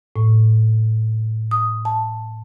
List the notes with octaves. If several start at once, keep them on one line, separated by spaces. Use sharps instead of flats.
A2
D#6
A5